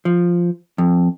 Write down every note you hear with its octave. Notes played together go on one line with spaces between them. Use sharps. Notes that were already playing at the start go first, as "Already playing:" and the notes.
F3
F2